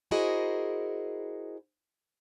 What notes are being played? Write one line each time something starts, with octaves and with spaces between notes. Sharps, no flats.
E4 F#4 G#4 A#4 C5 D#5